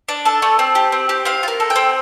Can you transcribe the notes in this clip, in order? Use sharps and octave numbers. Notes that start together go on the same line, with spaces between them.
D4
A4 A5
A3
C4
G4
C4
G4
C4 F5
F4
A#4
A4
G5
C4